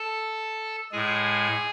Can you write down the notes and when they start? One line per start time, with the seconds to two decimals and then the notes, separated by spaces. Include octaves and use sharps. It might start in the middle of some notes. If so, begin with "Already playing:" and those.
Already playing: A4 A5
0.92 A2 G#3 G#4 G#5